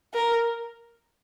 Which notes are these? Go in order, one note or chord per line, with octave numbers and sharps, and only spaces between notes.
A#4